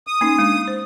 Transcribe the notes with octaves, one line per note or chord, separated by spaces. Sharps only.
D#6
A#3 C#4 D#4
G#3 D4
C5